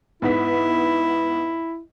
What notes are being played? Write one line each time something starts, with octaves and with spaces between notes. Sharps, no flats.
G#2 B3 E4 B6